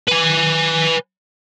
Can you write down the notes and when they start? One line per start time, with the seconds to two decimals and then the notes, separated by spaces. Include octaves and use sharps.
0.08 B4 G#5